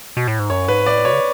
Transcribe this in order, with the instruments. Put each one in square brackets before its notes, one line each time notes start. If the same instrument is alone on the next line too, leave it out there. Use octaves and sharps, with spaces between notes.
[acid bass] B2
A2
G#2
[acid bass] F#2 [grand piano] C#5
[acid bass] G#2 [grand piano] B4
[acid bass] A2 [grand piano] D5
[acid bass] B2 [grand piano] C#5
[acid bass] C#3